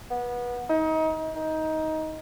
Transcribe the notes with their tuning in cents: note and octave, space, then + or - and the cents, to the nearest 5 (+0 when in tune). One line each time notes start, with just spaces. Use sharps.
B3 -25
D#4 +30
D#4 +15